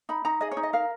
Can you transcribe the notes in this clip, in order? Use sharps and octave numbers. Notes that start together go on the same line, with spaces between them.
D#4 B5
D#4 A#5
G#4 D#5
C#5
D#4
D#5
A#4 F5